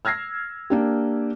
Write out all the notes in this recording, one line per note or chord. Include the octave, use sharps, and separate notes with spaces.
E6 F6 G#6 A#6 C7
A#3 D4 G4